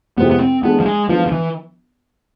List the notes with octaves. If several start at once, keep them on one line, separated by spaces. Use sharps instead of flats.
F2 C3 G#3 B3 C4 E4
B3
C4
E3 G#3 B3 D4 G#4
F3
G#3
E3 F3 G#3 B3 D4 F4
F3
E3